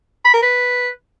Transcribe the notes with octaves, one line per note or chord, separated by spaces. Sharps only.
B5
A#4
B4